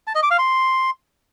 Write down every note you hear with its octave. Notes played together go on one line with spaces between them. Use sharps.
A5
D#5
D6
F5
C6